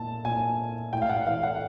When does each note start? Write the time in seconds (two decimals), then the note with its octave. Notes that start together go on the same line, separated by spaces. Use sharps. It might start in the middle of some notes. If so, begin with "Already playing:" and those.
Already playing: A#2 A5
0.25 A#2 G#5
0.93 A2 G5
1.02 F5
1.10 F#5
1.26 E3 F5
1.43 F#5